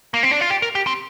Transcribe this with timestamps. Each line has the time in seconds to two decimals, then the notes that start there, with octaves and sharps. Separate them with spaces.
0.14 A#3
0.23 C4
0.31 D4
0.41 F4
0.50 G4
0.62 A#4
0.75 G4
0.87 C4